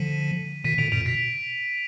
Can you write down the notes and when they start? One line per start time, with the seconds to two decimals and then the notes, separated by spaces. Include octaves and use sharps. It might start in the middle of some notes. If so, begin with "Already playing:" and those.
Already playing: D3 F3 B6 D#7
0.64 B2 D#3 B6 D#7
0.78 A#2 D3 D7 F7
0.92 F#2 A#2 D7 F7
1.05 B2 B6 D#7